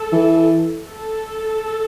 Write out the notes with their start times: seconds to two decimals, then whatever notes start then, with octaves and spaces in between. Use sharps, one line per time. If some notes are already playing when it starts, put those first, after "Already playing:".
Already playing: A4
0.12 E3
0.87 A4